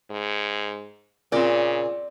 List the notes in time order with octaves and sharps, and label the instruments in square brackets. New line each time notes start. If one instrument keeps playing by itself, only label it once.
[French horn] G#2
[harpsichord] A#2 [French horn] C#3 [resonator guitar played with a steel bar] C4 D5